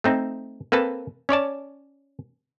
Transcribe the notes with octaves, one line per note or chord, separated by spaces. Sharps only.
A3 C4 D#4
A#3 C4 A4 B4 A5
C#4 C#5 D5 A5